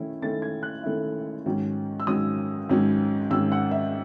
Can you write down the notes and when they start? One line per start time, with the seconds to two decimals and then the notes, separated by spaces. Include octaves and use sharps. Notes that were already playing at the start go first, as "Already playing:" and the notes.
Already playing: D#3 A3 C#4 E4
0.22 D#3 A3 C#4 E4 A6
0.42 G#6
0.63 F#6
0.83 D#3 A3 C#4 E4
1.46 G#2 D#3 F#3 C#4
2.00 E6
2.07 G#2 D#3 F#3 C#4 D#6
2.69 G#2 D#3 F#3 C#4
3.30 G#2 D#3 F#3 C#4 E6
3.52 F#5
3.71 E5